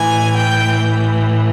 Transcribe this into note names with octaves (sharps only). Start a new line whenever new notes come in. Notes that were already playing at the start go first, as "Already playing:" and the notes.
Already playing: A2 E3 G#5
G5